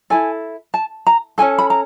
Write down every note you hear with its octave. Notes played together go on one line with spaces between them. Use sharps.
E4 A4 G#5
A5
A#5
C#4 F#4 A4 G#5
B5
A#5